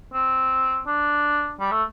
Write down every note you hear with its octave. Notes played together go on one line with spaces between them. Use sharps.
C4
D4
G3
A3